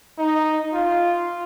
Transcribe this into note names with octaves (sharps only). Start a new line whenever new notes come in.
D#4
F4